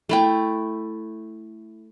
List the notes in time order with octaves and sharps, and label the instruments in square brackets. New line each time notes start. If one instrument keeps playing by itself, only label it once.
[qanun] A3 E4 G5